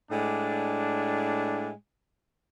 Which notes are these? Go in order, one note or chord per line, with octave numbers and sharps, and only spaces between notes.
A2 G#3 D4